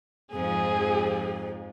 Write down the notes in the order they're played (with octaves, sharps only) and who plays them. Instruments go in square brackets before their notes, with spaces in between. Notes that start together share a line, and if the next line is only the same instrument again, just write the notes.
[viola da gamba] F2 G#2 F3 [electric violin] G#4